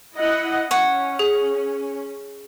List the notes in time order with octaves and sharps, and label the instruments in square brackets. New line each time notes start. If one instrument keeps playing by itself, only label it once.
[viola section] E4 D#5 F#5
[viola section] C#4 [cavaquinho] C#5 F#5
[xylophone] G#4